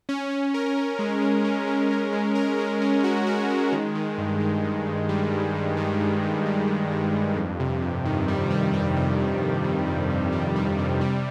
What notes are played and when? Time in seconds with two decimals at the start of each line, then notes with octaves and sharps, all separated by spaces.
0.09 C#4
0.31 C#4
0.54 A#4
0.77 C#4
0.99 G#3
1.22 G#3
1.45 C#4
1.67 G#3
1.91 A#4
2.13 G#3
2.35 A#4
2.58 G#3
2.82 C#4
3.04 F#4
3.27 F#4
3.50 G#3
3.72 D#3
3.95 D#3
4.18 G2
4.40 D#3
4.64 G2
4.86 G2
5.09 G3
5.31 G2
5.55 G2
5.77 D#3
6.01 G2
6.23 G2
6.46 G3
6.68 G2
6.91 D#3
7.14 G2
7.36 F2
7.60 C3
7.82 F2
8.05 D#3
8.28 G3
8.51 G3
8.74 G3
8.97 C3
9.19 C3
9.42 F2
9.64 D#3
9.87 F2
10.10 C3
10.32 G3
10.56 G3
10.79 C3
11.01 G3